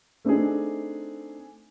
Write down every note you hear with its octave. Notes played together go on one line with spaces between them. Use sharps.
A3 C4 D4 D#4 G#4